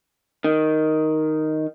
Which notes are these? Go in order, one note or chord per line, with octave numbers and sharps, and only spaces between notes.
D#3